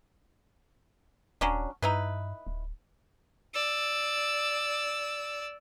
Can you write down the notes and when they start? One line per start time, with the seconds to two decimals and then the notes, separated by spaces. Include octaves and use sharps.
1.41 D#1 F#3 C#4 D4
1.82 G2 D#4 E4 B4
2.47 D1
3.54 D5 E6